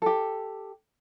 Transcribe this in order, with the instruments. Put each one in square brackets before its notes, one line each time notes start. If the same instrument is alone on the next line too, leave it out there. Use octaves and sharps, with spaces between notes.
[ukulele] G4 A4